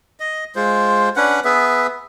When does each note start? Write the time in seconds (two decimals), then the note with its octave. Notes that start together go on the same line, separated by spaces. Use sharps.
0.20 D#5
0.56 G#3 F4 C5
1.16 C#4 D4 B4 F#5
1.45 B3 G#4 B4 E5